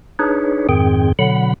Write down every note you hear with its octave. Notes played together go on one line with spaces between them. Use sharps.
D4 D#4 G#4 B4 C#5
F2 G#2 D#3 C4 G#4 G5
B2 D3 F#3 F#5 B5